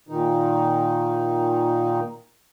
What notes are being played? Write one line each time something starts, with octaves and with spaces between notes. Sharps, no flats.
A#2 D#3 D#4